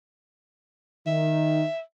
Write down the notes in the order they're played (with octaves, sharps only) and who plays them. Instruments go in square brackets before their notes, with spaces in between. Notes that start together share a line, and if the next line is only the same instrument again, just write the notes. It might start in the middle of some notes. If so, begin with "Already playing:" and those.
[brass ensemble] D#3 D#4 [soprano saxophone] E5